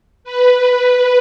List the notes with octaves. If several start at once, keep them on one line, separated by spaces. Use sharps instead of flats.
B4